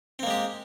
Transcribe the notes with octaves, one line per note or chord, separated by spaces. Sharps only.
G#3 A#3 C4 G4